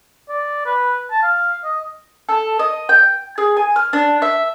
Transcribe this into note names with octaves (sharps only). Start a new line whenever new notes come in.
D5
B4
A5
F5
D#5
A4
D#5
G5
G#4
G#5
F6
D4
E5